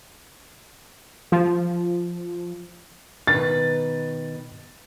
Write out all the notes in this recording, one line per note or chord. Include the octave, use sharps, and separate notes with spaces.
F3
B2 D#3 B4 A6